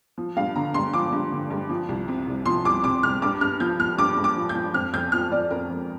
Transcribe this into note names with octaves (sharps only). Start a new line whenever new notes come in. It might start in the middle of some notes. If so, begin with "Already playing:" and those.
F3
G2 F5
D3 A#5
G2 C6
F3 D6
G2
D3
G2
F3
C2
C3
C2
F3 C6
C2 D6
C3 D6
C2 F6
G2 D6
G2 F6
F3 G6
F3 F6
G2 D6
G2
D6
F3
G6
F3
F2 F6
F2 G6
F3 F6
F3 D5
F2 A#4
F2